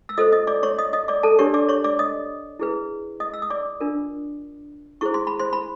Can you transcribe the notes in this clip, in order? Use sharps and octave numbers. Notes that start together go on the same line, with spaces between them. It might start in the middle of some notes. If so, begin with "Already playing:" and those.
E6
F4 A4 C5 D#5 D#6
D#5 D#6
D5 D6
C#5 C#6
D#5 D#6
D#5 D#6
D5 D6
A4 A5
D4 G4 A#4 C#5 C#6
D5 D6
C#5 C#6
D5 D6
D#5 D#6
E4 G#4 B4
D#5 D#6
E6
D#6
D5 D6
D4 F4 A#4
E4 G#4 C5 C#6
C6
B5
C5 C6
B5